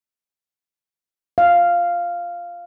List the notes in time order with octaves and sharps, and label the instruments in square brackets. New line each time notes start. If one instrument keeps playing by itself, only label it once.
[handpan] F5